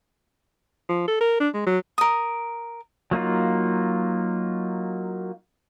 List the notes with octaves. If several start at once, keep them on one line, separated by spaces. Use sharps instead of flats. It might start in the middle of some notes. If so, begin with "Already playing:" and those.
F3
A4
A#4
D4
G#3
F#3
A#4 D#6
F#3 A#3 D#4 F4